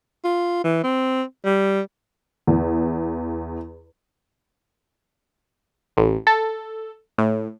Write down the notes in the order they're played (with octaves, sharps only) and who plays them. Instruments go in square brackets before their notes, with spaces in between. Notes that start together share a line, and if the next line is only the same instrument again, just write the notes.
[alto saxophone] F4
E3
C4
G3
[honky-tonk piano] E2
[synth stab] A1
A4
A2